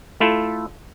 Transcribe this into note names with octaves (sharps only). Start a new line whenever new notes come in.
A3 E4 F4 A4